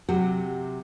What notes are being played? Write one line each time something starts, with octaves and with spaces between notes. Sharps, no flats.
C3 F#3 G4 F#5